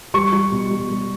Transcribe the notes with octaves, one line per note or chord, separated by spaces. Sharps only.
G3 C#6
G3
B2
G3
G3